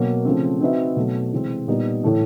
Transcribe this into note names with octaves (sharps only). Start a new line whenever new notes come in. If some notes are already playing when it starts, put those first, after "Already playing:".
Already playing: B2 F#3 A#3
C#3 F3 A3 C4
C4 D#4 F#4 B4 E5
B2 F#3 A3
C3 E3 G#3 C4
A#2 G3 B3 D#4
A2 E3 A3